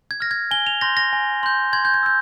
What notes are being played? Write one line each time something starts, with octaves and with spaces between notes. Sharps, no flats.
G#6
F6 A#6
G#6
G#5 G7
F7
C6 G6 A#6
A#6
G#5
C6 G6
C6 G#6
G6
G#6
E6 G6